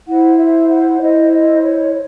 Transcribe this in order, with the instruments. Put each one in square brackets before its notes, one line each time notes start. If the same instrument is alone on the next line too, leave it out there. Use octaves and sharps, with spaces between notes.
[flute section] E4 C5 F#5
E5
F#5
E4 C5 D#5
D#5
C#5